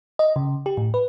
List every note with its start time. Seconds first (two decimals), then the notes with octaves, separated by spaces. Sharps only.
0.19 D#5
0.36 C#3
0.66 G4
0.77 A2
0.94 B4